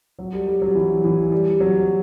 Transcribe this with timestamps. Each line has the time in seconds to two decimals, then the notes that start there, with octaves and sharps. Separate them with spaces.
0.19 F#3
0.33 G3
0.47 G3
0.62 F#3
0.75 E3
1.04 E3
1.32 G3
1.60 F#3